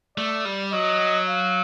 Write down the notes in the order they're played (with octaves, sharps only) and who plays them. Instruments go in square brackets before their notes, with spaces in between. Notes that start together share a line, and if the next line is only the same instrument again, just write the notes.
[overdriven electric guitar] A3 [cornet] D5
[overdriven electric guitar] G3
[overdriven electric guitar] F#3 [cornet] D#5
[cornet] F5